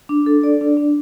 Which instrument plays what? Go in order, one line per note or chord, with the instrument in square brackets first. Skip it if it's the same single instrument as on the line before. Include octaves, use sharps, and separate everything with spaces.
[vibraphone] D4
A4
D5
D4
D4